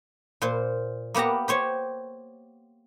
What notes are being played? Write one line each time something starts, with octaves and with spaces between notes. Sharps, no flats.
A#2 C5
A#3 B3 G4 F#5 A#5
G4 C5 C#5